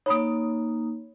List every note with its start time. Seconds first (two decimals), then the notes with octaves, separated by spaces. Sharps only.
0.06 A#3 D#4 C#5 B5 D#6